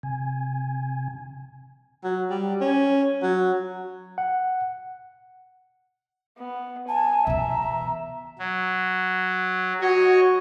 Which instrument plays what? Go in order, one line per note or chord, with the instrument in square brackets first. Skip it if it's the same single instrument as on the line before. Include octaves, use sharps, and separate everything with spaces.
[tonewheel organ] C3 G#5
[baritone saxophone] F#3
G3
C#4
F#3
[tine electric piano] F#5
[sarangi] B3
[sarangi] G#5 [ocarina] A5
[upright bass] B2 E3 [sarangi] E5 [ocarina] A#5
[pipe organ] F#3
[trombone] F#4 [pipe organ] C#5 D#5 G#5